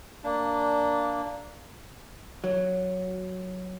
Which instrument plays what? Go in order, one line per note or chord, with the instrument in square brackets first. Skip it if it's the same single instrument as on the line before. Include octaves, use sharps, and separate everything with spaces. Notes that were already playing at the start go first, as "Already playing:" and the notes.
[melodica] A#3 D4
[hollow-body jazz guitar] F#3